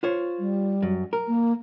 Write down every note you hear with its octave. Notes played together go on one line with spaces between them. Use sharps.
F4 C5 C#5
G3
F#2
A#4
A#3